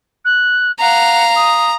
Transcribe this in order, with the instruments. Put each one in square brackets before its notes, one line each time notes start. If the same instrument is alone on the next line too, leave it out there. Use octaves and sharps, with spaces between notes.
[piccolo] F#6
[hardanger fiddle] F5 [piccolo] F#5 [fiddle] A#5
[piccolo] D#6